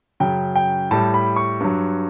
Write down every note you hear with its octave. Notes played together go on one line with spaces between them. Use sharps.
F#2 C#3 F#3 G5
G5
A2 G3 A5
B5
C#6
G2 F#3